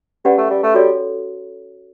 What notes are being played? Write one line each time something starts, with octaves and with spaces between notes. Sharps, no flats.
G3 C#4 G4 B4 D5 F#5
A3
G3
A3
G3 F#4 A4 C#5